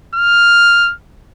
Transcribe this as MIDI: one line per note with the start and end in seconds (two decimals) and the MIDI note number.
0.16 0.93 89